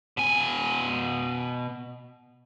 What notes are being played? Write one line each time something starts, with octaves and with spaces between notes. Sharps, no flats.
B2 G#5